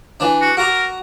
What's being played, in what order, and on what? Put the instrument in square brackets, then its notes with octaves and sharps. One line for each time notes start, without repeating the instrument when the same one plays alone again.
[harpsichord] E3 D4
[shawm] F#4
[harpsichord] F#4 A#5 D6 [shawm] A#4